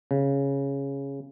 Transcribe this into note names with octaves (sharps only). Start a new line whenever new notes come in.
C#3